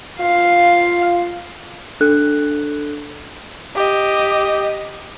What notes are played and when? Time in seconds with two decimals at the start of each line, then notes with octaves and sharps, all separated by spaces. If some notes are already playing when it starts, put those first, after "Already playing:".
0.21 F4 F5
2.01 D4 A4 F#6
3.76 G4 D#5